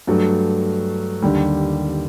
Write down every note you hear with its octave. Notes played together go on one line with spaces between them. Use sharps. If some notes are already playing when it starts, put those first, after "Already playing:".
G2 F#3 A3
D#2 D3 G3